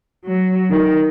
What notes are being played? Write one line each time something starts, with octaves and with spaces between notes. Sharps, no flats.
F#3
D#3